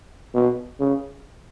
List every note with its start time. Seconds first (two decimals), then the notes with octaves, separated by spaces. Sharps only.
0.35 B2
0.80 C#3